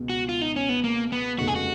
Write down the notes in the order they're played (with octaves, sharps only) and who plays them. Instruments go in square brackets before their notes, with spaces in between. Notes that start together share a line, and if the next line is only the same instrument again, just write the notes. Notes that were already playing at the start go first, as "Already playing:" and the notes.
Already playing: [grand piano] C#2 B2
[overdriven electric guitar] F#4
F4
D#4
C#4
B3
A#3
B3
[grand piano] F1 D#2 C#3 G#3 [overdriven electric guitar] F#4
[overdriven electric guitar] G#4
F#4